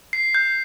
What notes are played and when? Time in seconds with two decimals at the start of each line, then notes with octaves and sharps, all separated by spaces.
0.13 C7
0.35 G6